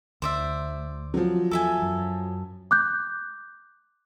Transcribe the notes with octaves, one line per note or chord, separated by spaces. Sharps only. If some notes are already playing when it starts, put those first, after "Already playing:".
D2 C5 D5 E5
F3 F#3
E2 A4 E5 G#5
F#2
D6 F#6 G6